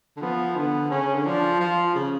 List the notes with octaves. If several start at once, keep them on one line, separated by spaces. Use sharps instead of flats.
D3
F3 B3
D3 B3
C#3 C#4
D3
F3 D4
F3 F4
C#3